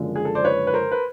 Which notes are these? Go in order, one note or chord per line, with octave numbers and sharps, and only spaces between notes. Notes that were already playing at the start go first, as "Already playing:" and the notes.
Already playing: F#1 F#2 D3 F3 G#3
G#4
A4
C5 D5
B4 C#5
B4
A#4 C5
B4